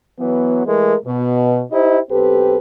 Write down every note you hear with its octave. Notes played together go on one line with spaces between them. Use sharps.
E3 F#3 B3
E3 G#3 A3 A#4
B2
D#4 E4 G4 C5 D#5
B1 C4 G4 A4 B4